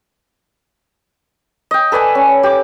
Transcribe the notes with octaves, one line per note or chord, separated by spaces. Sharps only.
D#5 G5
A4 B4 D5 G#5
C#4
G4 D6